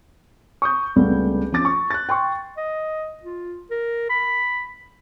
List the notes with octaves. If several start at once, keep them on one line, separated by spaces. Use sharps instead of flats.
C#6 D#6 G6
C#2 C3 G3 A3 B3
F3 C#4 F4 D6 A6
C#6
F#6 A6
G5 C6 C#6
D#5
F4
A#4
B5